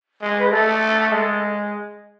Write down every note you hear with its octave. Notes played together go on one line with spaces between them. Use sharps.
G#3
B4
G#4
A3 A4
G#3